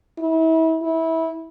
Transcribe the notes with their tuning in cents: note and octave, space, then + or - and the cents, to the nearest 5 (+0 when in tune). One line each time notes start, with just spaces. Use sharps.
E4 -35
E4 -20